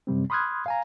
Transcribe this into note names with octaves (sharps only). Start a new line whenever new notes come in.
F#2 C3 G3 C4
B5 C6 D#6 F6 F#6 G#6
F5 G#5 A#5